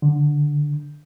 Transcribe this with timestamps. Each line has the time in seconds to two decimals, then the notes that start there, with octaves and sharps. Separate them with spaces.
0.02 D3